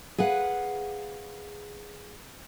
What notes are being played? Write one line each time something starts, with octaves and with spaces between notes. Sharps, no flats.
G#4 B4 F5 F#5